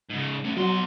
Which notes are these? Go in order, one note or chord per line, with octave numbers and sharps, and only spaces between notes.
G#2 C#3
A3 C#4
B2 F#3 C6